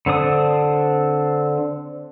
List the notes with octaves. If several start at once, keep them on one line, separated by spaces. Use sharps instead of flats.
D3 C4 D4 D#6